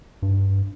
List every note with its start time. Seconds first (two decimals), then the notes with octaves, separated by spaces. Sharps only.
0.22 G2